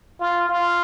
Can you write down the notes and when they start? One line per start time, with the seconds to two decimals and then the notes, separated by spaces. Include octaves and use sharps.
0.20 F4
0.49 F4